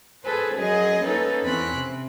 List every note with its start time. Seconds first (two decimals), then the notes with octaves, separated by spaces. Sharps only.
0.23 G#4 A4 B4 C5
0.54 F#2 F#3 G#4 D#5
1.02 A#3 C#4 D#4 A4 B4
1.43 E2 C4 C#4 B5 F#6
1.76 C3